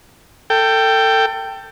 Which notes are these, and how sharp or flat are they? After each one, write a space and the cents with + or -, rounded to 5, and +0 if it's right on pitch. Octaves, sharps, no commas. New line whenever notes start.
A4 +25 G5 +0